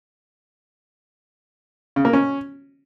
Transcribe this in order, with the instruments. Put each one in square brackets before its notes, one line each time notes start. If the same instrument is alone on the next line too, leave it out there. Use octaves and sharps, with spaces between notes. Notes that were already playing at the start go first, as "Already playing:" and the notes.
[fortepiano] C#3
A#3
C#4